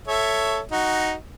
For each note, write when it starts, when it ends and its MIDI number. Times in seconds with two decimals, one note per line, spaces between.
0.07 0.60 69
0.07 0.60 73
0.07 0.60 76
0.71 1.14 63
0.71 1.14 66